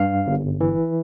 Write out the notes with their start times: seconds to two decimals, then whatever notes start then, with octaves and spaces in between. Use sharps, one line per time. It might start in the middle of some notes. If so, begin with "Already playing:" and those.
Already playing: G2 F5
0.27 G1
0.61 E3